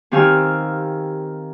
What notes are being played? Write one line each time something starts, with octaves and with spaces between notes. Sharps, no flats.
D#3 C4 G4 F5 G#5 E6